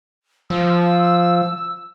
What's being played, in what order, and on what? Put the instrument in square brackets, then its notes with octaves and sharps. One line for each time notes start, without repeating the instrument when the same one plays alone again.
[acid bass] F3 [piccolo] E6